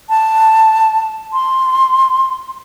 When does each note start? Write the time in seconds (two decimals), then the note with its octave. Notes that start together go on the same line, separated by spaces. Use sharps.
0.09 A5
1.33 C6